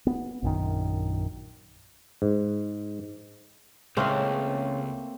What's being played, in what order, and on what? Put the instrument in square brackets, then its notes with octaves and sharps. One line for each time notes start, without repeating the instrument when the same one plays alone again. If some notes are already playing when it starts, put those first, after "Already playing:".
[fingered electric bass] B3
A#1 F#2 D#3
[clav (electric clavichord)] G#2
[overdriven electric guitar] C#2 [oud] C#3 E3 C#4 [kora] A3 A#3 C4